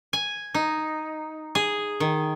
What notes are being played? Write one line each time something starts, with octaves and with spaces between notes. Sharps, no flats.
G#5
D#4
G#4
D#3